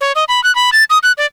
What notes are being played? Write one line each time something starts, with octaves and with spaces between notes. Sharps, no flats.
C#5
D#5
B5
F#6
B5
A6
D#6
F#6
D5